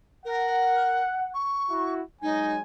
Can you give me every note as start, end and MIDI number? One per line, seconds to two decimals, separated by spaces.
0.25 1.02 70
0.25 1.36 78
1.33 1.91 85
1.70 2.01 64
1.70 2.01 66
2.22 2.62 54
2.22 2.62 56
2.22 2.53 63
2.22 2.62 80